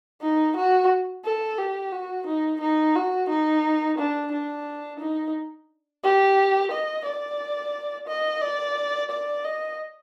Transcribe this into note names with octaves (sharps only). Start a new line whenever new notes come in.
D#4
F#4
A4
G4
F#4
D#4
D#4
F#4
D#4
D4
D4
D#4
G4
D#5
D5
D#5
D5
D5
D#5